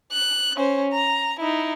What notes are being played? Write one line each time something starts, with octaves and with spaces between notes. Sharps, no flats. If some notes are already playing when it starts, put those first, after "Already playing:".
F#6
C#4 C5
A#5
D#4 E4